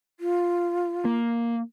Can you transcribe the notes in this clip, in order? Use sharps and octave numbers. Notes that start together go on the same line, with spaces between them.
F4
A#3